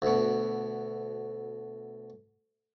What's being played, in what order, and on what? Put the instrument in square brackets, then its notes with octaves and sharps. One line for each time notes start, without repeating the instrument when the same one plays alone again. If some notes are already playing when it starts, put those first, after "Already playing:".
[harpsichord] D2 B2